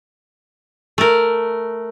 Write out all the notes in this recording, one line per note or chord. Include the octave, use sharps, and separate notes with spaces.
A3 A#4